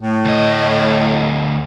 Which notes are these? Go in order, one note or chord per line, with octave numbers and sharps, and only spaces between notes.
A2
D2 D#5